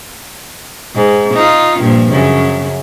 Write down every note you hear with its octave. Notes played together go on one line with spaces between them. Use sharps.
G#2
D#4 F4
G2 A#2 F3
F#2 C#3